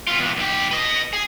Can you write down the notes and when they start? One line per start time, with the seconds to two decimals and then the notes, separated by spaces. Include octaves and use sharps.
0.07 B3 F4
0.19 E2 A#2
0.36 B1 G4
0.71 B4 D#5
1.13 G#4